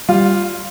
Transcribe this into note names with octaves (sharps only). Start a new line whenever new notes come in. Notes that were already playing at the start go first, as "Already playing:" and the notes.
G3 F4